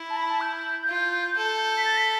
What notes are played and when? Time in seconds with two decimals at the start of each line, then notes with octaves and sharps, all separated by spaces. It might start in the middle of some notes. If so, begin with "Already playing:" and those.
Already playing: E4
0.10 A5
0.16 B5
0.29 A5
0.41 G6
0.88 F4
1.37 A4
1.77 B6
1.85 A6
1.97 B6